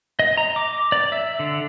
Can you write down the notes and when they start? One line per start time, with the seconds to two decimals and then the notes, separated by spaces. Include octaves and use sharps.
0.19 D#5
0.37 A#5
0.56 D6
0.92 D5
1.12 E5
1.39 D3